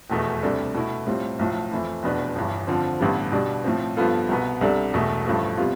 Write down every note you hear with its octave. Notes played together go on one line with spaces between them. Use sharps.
F1 E2 B2 A3
D2 C3 G3 D4 A4
B2 A3 E4
A2 G3 C4 F4
B1 A2 F3
F2 E3 A3 C4 E4
F1 E2 B2 B3 D4
G1 G2 E3
F2 D3 F3 C4
A1 G2 D3 G3 B3
B2 G3 D4
A2 F3 C4
G2 F3 B3 F4 A4
C2 B2 B3
C2 C3 G3 D4 A4
E1 E2 B2 A3
A1 G2 F3 A3
C3 G3 B3 F4